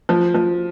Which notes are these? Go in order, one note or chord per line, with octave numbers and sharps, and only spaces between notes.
F3
F3